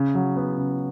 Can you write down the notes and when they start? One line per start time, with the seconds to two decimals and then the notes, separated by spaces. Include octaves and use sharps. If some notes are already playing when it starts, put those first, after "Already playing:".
Already playing: C#3
0.15 F#3
0.36 B3
0.58 C#3